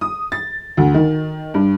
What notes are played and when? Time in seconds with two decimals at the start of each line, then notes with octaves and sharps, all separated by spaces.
0.01 D#6
0.32 A6
0.77 D2
0.94 D#3
1.54 G2